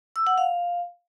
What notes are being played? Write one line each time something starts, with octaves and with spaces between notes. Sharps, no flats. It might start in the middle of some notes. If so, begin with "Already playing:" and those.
E6
F#5
F5